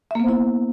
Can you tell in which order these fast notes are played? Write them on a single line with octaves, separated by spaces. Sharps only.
E5 A#3 B3 C5 E4